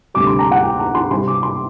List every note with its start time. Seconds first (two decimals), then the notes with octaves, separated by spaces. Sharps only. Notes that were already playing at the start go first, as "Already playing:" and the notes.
0.14 D2 C3 G3 D6
0.27 C6
0.39 A#5
0.51 F#5
0.63 G5
0.79 A#5
0.95 C6
1.11 C3 G3 C4 C6
1.28 D6
1.43 C6